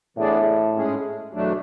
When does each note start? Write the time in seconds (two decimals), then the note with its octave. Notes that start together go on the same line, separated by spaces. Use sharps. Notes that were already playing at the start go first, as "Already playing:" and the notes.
0.17 A2 E3 B3 D4 G#4 D5
0.75 G#2 G#3 C#4 G#4
1.33 E2 B2 F#3 A3 D4